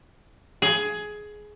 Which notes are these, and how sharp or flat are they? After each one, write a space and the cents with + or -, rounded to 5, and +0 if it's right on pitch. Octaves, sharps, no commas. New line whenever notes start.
G#4 +15